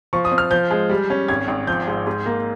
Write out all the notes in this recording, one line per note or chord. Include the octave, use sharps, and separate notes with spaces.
F3 C#6
D#6
C4
F6
F3 G6
G#3
G3
C#4
G#1 G#6
G#1
F3 G6
G#2
G#2
A#3